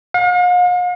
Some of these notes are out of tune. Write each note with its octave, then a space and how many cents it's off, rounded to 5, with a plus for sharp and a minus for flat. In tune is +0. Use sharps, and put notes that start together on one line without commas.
F5 +45